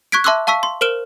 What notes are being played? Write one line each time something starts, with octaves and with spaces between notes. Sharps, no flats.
C#6 F#6 G#6 B6 D7
E5 A5 C6 D6 E6 F#6
F5 A5 C#6 E6 B6
C6
A#4 C5 F6 D7 E7 G7